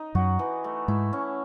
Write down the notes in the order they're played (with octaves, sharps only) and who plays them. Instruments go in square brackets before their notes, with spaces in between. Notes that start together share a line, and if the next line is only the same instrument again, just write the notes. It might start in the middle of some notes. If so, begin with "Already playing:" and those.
Already playing: [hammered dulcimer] D#4
[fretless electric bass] F#2 F#3 [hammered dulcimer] F#4
[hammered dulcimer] E3
A3
[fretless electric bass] G#2 G#3 [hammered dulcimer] E4
[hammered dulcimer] C#4